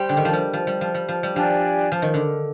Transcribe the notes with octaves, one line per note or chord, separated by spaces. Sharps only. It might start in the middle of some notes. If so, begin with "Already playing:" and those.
Already playing: G3 G4 C5 G5
D3
D#3
F3
G3
F3
G3
F3
G3
F3
G3
F3 D4 G4 D5 G#5
F3
D#3
D3